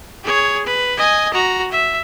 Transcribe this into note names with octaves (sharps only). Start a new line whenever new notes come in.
G#4 C#5
B4
D#5 G#5
F#4 A#5
E5